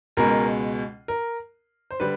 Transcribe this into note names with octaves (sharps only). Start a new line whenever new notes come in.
C#2 B2 G#3 A#4
A#4
C5
D3 G3 B4